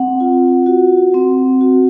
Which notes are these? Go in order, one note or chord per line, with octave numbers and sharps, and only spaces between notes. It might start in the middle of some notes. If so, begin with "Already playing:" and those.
Already playing: C4 F#5
F4
F#4
C4
F#4